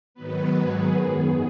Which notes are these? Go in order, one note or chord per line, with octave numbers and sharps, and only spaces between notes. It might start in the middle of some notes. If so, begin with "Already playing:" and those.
G#2 D#3 F#3 B3 B4
G#4
F#2 D#3 B3 G#4